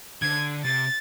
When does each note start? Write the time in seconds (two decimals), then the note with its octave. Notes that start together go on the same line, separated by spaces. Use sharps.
0.22 D3 G#6
0.65 C3 A6